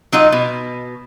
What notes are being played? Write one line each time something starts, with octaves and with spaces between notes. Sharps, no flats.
F#3 D#4 F4 D#5
B2